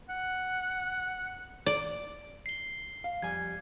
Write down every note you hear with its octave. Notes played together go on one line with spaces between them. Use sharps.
F#5
D5
C7 G7
F5
F2 G3 G#5 G#6